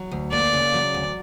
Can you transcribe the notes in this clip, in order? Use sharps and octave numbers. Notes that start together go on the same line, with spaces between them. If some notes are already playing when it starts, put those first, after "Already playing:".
Already playing: F#3
D2
A#3 D5
C#3
F#3
D2